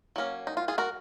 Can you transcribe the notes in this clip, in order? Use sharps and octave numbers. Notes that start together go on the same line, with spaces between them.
F#3 A#3 C#4
D#4
F4
F4 G#4
F#4 A#4